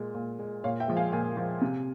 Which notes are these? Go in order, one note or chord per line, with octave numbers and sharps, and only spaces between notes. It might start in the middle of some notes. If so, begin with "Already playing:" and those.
Already playing: A#2 G#3
A#2
G#3
A#2 C#5 F5
E5 G5
F3 G#3
F5 G#5
A#2 F5 G#5
F3 G#3
C3